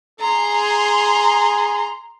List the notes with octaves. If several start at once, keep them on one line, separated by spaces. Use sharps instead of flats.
G#4 A#5 C6